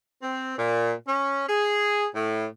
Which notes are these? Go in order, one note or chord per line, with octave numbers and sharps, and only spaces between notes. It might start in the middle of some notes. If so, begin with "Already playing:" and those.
C4
A#2
C#4
G#4
A2